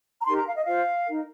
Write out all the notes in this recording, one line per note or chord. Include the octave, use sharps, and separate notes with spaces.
A#5
D#4 G4 A#4 C6
A#5
F5
D#5
F4 C5 F5
D#4 A#4